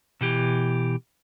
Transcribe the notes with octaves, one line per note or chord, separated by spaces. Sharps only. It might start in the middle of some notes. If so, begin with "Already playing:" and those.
B2 E3 G4